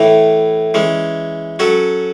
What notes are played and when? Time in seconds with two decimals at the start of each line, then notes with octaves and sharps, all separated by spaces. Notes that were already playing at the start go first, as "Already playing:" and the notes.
Already playing: A2 E3 A3
0.74 E3 G#3 C#4
1.59 F#3 C#4 F#4 A4